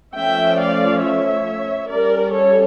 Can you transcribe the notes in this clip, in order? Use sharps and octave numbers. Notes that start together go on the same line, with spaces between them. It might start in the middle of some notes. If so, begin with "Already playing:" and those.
F3 A3 C#4 E5 G5
D5 F5
C#5 E5
G3 C#4 A#4 D5
A4 C#5